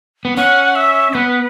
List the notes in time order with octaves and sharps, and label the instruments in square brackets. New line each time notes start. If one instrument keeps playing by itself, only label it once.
[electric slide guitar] B3
[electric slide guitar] C#4 [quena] F#5
[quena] E5
[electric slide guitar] B3 [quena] B4